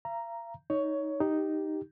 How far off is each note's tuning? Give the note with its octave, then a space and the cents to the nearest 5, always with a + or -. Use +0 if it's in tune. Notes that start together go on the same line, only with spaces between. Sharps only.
F5 -45 A#5 +0
D#4 +10 C#5 +15
D#4 +0 G4 +0